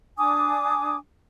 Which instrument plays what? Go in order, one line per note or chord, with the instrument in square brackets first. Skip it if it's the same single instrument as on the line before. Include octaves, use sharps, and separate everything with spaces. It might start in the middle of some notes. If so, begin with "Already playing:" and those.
[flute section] D4 G#5 D6 D#6